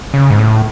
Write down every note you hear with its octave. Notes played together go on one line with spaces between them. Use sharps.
C#3
G#2
A2